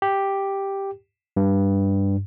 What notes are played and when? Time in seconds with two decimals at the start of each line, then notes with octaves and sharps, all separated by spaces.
0.02 G4
1.37 G2